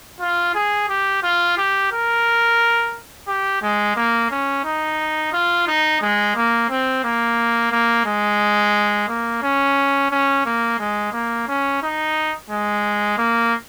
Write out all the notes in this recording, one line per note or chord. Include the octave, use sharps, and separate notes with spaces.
F4
G#4
G4
F4
G4
A#4
G4
G#3
A#3
C#4
D#4
F4
D#4
G#3
A#3
C4
A#3
A#3
G#3
A#3
C#4
C#4
A#3
G#3
A#3
C#4
D#4
G#3
A#3